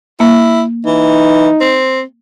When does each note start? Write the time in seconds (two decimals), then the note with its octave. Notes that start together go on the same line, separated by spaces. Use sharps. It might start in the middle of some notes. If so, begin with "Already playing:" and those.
0.20 A#3 E4
0.86 E3 D#4
1.61 C4